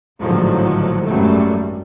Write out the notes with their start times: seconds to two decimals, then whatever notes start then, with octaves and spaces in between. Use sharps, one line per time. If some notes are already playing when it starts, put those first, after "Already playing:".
0.21 A1 G#2 D3 D#3 F3 F#3
1.06 G#1 F#2 F#3 G3 A3